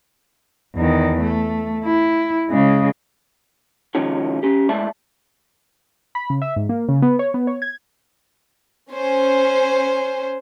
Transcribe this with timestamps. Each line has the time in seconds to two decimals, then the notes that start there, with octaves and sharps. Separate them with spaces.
0.75 E2 D#3
1.22 A3
1.85 E4
2.51 C#3 G#3
3.95 C3 D#3 F3 G#3 C#4 F#4
4.43 C#4 G4
4.69 A2 G#3 D5 E5 A5
6.15 B5
6.30 C#3
6.42 E5
6.56 G#2
6.69 A#3
6.89 C#3
7.02 B3
7.19 C#5
7.34 B3
7.47 C#5
7.62 G#6
8.91 C#4 C5